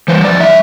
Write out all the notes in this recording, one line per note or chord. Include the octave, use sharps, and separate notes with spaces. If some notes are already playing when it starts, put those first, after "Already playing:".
E3 G3 C5
F2 D5
E3 G3 E5